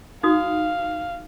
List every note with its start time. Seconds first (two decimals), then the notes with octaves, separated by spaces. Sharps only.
0.23 D#4 F#4 F5 D#6